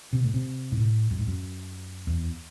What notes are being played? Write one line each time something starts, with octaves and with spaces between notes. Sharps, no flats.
C3
A2
C3
G#2
A2
F#2
G#2
F#2
E2